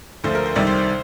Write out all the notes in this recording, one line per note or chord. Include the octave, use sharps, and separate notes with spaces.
D2 D3 F3 C5
A#4
C5
C2 C3 D#3 G3 D5
C5
C5